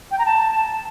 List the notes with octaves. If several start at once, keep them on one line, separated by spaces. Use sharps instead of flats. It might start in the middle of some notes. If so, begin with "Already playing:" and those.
G5
A#5
A5